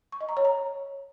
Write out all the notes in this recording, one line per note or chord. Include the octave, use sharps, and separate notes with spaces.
C#6
D#5
A#5
C#5
A#5